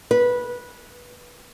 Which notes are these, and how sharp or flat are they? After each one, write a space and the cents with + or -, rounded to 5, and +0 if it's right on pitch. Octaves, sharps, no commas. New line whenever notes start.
B4 -15